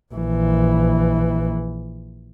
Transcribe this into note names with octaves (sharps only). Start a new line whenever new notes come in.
A#1 E3